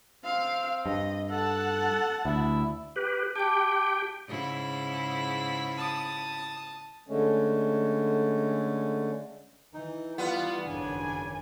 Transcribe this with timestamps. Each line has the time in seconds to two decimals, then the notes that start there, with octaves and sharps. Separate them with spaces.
0.25 C4 F5
0.86 G2 D#5
1.30 A4 F#5 A5
2.25 D2 E4
2.96 G4 B4
3.36 G4 G5 A5 D6
4.28 G#2 C#3 E4
5.77 A5 D#6
7.08 D3 G#3 A3 C#4
9.74 E3 D#4
10.18 G3 B3 F4 F5 F#5
10.67 G#1 F#2 C#3 D4 G#5